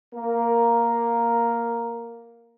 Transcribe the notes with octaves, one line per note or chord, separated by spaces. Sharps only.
A#3 A#4